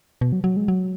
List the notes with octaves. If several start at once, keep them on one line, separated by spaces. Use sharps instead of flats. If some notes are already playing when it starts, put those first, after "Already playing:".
B2
F#3
F#3
G#3
F#3